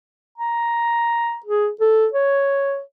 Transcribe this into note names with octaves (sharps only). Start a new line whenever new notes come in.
A#5
G#4
A4
C#5